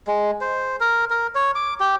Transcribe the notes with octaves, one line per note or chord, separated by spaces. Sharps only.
G#3
C5
A#4
A#4
C#5
D6
G4